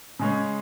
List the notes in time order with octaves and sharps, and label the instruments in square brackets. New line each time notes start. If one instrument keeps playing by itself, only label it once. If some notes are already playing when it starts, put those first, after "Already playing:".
[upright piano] C#3 G#3 C#4